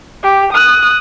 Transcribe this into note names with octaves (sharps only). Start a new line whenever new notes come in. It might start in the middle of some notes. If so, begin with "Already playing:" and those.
G4
D#6 F#6